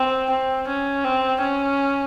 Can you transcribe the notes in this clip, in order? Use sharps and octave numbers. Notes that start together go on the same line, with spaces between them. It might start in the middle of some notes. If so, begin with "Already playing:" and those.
Already playing: C4
C4
C#4
C4
C#4